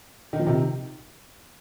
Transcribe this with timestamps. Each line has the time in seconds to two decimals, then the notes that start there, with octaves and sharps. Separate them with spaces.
0.33 D#3
0.39 F3
0.46 C3 D#3